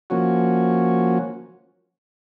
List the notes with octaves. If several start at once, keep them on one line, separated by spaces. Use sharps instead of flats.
F3 A#3 C#4 F#4